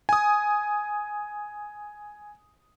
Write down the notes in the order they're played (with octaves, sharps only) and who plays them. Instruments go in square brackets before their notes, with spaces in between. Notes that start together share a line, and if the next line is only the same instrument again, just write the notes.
[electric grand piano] G#5 D#6